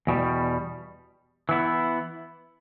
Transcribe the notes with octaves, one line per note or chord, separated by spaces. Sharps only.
E2 B2 G3
E3 B3 E4